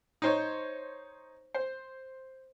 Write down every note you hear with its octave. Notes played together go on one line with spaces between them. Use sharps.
D#4 C5 C#5
C5